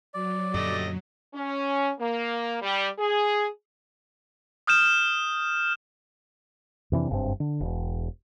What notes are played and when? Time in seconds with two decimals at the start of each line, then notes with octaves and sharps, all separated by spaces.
0.14 F#3 D5
0.54 F#2 A#2 D3 G3 A3 D#5
1.34 C#4
1.99 A#3
2.62 G3
2.99 G#4
4.67 D#6 F6 G6 E7
6.92 F2 C3 E3 D4
7.10 F#1 G2 C#3 C4
7.40 D3
7.60 E1